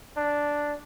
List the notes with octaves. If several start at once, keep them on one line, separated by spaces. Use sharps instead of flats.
D4